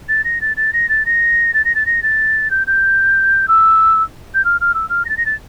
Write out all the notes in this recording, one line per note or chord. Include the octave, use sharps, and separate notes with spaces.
A6
A#6
A6
A6
A#6
A6
A#6
A6
A#6
A6
A#6
A6
G6
G6
E6
G6
F6
F6
E6
F6
A#6
A6
A#6
A6